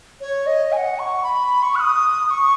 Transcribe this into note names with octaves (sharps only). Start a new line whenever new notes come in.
C#5
D#5
G#5
F#5
C#6
B5
C#6
F#6
D#6
D#6
C#6